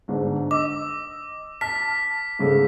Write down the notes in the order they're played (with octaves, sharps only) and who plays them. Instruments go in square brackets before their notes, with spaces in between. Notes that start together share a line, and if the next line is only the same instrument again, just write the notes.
[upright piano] G1 G#2 D4
[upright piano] D#5 E6 [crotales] D6
[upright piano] A5 F6 [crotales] B6
[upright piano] G#2 C#3 A3